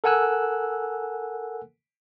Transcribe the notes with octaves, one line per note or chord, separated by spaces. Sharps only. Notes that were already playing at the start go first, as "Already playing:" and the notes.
A4 A#4 F#5 G#5 E6 F#6